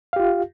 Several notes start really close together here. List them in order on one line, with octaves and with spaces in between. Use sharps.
F5 G4 F4